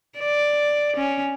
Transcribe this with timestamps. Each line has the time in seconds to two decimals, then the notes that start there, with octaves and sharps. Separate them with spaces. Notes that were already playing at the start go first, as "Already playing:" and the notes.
0.18 D5
0.97 C#4